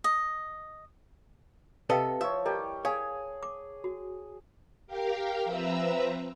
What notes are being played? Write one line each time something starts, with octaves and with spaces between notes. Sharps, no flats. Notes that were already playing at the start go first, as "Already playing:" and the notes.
D#5
C3 A4 B4 D#5 F5 G5
F3 C#5 E5
G3 E4 G4 A#4 D#5
G#4 C#5 F5 G#5
D6
F#4
G4 A#4 F5 G5
F3 C4 B4 E5 A#5 E6